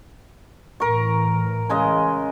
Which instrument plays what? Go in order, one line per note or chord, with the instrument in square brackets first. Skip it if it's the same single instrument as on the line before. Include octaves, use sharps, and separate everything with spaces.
[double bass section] A2 E3 [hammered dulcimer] A#4 C#6
[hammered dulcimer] C#3 G#3 D#5